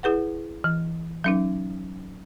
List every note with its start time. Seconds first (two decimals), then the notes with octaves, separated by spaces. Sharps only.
0.03 E4 G#4 B4 F#5
0.64 E3
1.24 F#3 C#4 D#4